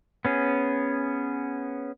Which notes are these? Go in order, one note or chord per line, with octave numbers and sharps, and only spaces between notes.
B3 C#4 G#4